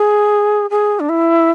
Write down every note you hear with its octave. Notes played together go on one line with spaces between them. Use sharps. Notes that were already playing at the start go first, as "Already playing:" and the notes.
Already playing: G#4
G#4
D4
E4